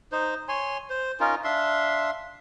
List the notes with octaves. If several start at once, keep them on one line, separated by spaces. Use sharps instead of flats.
D#4 C5
C#5 G#5 C6
C5
C#4 D#4 F4 A#4
D4 E5 F5 C6